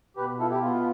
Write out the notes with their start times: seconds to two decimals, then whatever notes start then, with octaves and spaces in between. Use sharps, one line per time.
0.16 B2 G4 B4
0.40 E4 F4 A4
0.50 E4 G4
0.62 B3 F4